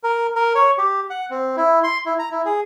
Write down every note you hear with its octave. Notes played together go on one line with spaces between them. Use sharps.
A#4
A#4
C#5
G4
F#5
C4
E4
C6
E4
A#5
E4
G#4